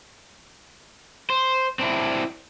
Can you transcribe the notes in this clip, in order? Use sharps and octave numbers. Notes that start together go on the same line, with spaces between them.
C5
C4 D4 E4